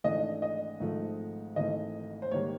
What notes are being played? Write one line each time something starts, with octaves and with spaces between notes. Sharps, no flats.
G#1 G#2 E3 A3 D4 D#5
D#5
G#1 G#2 F3 A3
G#1 G#2 E3 A3 D#5
C5
G#2 D#3 G3 A#3 C#5